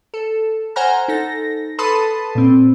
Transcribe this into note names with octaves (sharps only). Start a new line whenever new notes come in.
A4
C5 F#5 G#5 A#5 F6
D#4 A4 A#6
A4 B4 A5 B5 C6 D#6
A#2 C4